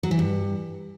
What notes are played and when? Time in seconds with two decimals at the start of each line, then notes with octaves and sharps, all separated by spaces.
0.03 F#3
0.11 E3
0.19 G2